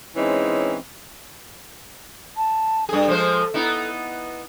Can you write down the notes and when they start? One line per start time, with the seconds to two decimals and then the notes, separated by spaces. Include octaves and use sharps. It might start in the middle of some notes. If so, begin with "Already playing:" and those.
0.16 E3 G#3 C4 C#4 D#4 C#5
2.37 A5
2.89 G2 G#4 A4
3.08 F3 G#3 C5
3.54 B3 D#4 E4